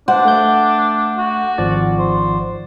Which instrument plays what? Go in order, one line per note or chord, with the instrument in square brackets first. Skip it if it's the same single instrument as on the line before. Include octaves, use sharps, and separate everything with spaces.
[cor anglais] D4 [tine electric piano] C5 [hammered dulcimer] F#5
[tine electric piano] A3 G6
[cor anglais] F#4
[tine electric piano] G#1 F3 D5
[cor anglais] C5